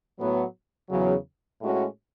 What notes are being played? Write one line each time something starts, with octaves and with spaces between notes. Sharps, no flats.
A2 F#3 B3
E2 C#3 F#3
A2 G#3 C#4 F#4